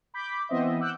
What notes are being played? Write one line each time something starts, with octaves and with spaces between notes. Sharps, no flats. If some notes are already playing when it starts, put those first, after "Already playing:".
B5 D6 G6 B6
E3 B3 C4 C5 D#5 E5
F#5 D6 E6 F#6 G6